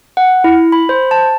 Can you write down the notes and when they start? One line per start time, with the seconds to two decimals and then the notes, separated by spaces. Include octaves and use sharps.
0.17 F#5
0.44 E4
0.72 B5
0.89 C5
1.11 A5